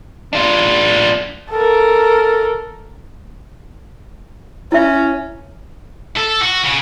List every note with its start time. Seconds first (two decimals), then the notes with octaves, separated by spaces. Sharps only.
0.33 D4 F4
1.51 A4 A#4
4.72 C#4 E4 E5
6.17 A4
6.42 F#4
6.64 C#3